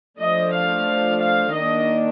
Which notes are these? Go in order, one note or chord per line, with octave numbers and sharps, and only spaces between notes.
F3 A3 D4 D#5
F5
F5
D#3 A#3 D4 D#5